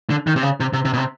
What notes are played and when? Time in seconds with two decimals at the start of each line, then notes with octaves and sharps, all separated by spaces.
0.10 D3
0.27 D#3
0.36 C3
0.43 C#3
0.60 C3
0.73 C3
0.85 C3
0.93 B2
0.97 C3